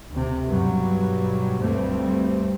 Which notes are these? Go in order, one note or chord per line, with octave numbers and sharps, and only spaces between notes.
D2 C3
G2 B2 F#3 G3
D2 G2 G3 A3 C4